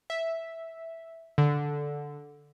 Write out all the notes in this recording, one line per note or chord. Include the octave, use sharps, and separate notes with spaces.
E5
D3